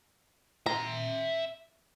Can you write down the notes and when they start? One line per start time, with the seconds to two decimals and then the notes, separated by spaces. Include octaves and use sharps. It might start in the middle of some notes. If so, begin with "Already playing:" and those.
0.66 E5 A#5 C6